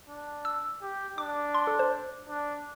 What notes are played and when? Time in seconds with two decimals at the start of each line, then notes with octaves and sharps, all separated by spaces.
0.08 D4
0.45 E6
0.82 G4
1.18 D4 D6
1.55 C6
1.67 A4
1.79 C5
2.29 D4